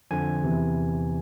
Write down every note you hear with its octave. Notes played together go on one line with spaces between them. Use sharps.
F2 D3 F3 G#5
E2 C3 E3